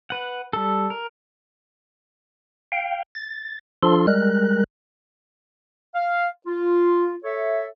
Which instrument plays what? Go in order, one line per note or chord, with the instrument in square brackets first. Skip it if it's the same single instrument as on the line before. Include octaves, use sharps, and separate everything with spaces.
[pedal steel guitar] B4 F#5
G3 A4
A#4
[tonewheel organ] F5 G5
A6
F3 D4 F4 A4 C6
G3 G#3 A#4 F#6
[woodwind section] F5
F4
A4 C#5 E5